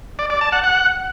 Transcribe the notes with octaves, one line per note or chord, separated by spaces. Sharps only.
D5
D5
A5
F#5
F#5